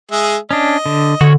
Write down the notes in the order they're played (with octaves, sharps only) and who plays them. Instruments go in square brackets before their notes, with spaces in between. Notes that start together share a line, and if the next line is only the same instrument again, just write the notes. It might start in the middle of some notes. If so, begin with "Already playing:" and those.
[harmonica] G#3 G#4 E5
[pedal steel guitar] C#4 D4 [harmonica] D#5
[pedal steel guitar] D3
[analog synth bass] D3 [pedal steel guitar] F#4 C#5